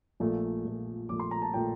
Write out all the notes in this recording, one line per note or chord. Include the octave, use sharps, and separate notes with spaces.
A#1 A#2 F3 A3
A#1 A#2 F3 A3
A#1 A#2 F3 A3 D6
C6
A#5
A5
A#2 F3 A3 G5